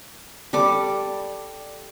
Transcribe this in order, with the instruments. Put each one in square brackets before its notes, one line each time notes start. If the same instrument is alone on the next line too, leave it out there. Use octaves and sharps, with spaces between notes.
[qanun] G3 A4 D5 D6